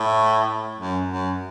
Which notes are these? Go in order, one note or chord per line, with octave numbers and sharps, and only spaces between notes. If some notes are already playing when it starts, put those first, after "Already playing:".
Already playing: A2
F#2
F#2